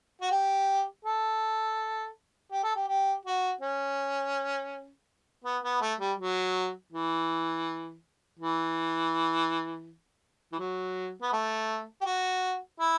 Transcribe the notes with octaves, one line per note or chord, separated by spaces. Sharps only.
F#4
G4
A4
G4
A4
G4
G4
F#4
C#4
B3
B3
A3
G3
F#3
E3
E3
E3
F#3
B3
A3
G4
F#4
E4